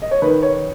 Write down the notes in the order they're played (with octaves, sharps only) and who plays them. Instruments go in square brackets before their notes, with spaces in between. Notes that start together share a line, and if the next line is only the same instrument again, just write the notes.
[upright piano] D#5
C#5
D#3 B4
C#5